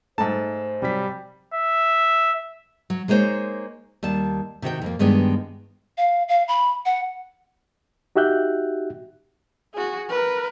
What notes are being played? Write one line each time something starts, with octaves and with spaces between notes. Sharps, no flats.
G#2 A3 D#4 C5 A5
C3 F#3 G3 B6
E5
F#3
G#3 A#3 D#4 F#4 C5 C#5
D#2 G3 A5
C3 D#3 F#4 G5
F2 A#3
G2 D#3 G#3 B3 D4 G4
F5
F5
B5
F#5
D#4 F#4 G4 E5 F#6 G6
F#4 G#4
A#4 B4